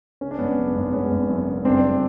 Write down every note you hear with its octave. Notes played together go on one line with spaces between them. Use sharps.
C#3 C#4
D4
G#1 B3 C#4
F#2
G#1
G#1 B3 C#4
G#1
F#2
C#3
G1 C4 D4
G1